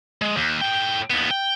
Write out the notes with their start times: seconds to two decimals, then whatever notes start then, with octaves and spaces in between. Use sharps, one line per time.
0.22 G#3
0.37 D#2
0.61 A2 G5
1.10 D#2 B3
1.31 G5